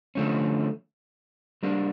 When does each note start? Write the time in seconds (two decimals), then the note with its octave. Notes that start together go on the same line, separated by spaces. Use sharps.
0.15 D3 F3 A3 C#4
1.63 G3 A#3 D4